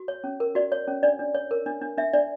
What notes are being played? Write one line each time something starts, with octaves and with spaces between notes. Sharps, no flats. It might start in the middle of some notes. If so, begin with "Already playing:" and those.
Already playing: F#4
C#5
C#4
A#4
F#4 D5
C#5
C#4
D4 D5
D4
C#5
A#4
D4
D4
D4 E5
D4 D5